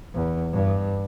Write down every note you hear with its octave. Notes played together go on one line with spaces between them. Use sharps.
E2
G2